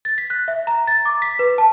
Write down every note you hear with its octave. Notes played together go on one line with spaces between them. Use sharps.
A6
B6
F#6
E5
A#5
A6
D6
B6
B4
A5